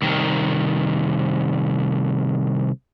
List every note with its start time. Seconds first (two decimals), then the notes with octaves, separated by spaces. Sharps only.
0.02 C2 D#3